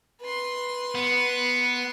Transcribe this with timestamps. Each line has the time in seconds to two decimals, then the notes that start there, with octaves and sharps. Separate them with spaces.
0.21 B4 C6
0.95 B3